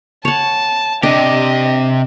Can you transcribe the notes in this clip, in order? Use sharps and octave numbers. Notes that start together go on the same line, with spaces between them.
C#5 F#5 A5
C3 D4 G4 D#5